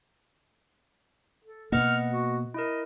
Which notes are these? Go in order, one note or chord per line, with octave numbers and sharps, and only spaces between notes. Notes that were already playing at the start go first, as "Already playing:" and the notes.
A4
B2 A#3 B4 D#5 F#5 F6
F#4
E4 A#4 D#5